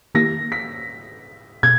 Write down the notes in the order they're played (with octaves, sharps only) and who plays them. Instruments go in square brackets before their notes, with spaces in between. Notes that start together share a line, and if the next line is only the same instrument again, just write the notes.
[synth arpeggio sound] D#3 A#3 E4 G4 [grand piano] A#6
[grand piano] B6
[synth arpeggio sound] B2 [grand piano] G#6